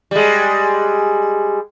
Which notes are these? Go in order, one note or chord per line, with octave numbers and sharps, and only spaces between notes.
G3 G#3